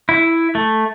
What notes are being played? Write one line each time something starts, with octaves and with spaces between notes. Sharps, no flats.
E4
A3